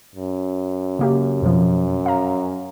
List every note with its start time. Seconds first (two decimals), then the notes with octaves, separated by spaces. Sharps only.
0.15 F#2
0.99 C#3 A#3 G4
1.42 F2 B2 F3
2.06 F5 A#5